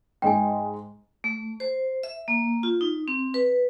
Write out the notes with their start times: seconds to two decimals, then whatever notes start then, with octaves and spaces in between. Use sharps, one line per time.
0.22 G#2 G#3 D#5 G5 G#5
1.24 A3
1.60 C5
2.03 E5
2.28 A#3
2.63 F4
2.81 D#4
3.08 C4
3.34 B4